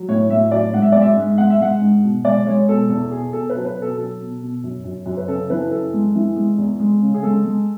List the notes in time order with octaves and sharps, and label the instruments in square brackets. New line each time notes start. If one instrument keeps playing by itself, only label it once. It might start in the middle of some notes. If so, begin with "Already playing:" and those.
Already playing: [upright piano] F#3
A2 C#5
A2 E5
F#3 D5
G#2 F#5
E5
G#3 D5
E5
G#2
G#3 F#5
E5
G#3 F#5
G#2
B2
G#3 D5
G#3 C#5
B2 A4
E2 A4
B2 G#4
B2 A4
B4
F#3
B4
B2 A4
F#3 A4
B2
B2
F#2
F#2
F#2
B4
C#3 A4
E3 B4
F#2 A4
G#3
E3
G#3
E2
G#3
C#3
G#4
G#3 A4
G#3